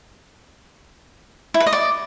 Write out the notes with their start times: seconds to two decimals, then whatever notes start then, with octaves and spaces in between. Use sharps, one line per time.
1.54 E4
1.60 B4
1.66 D#5
1.73 D5